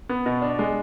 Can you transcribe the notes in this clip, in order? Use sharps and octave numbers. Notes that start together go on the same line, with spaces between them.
B3
B2
D4
G#3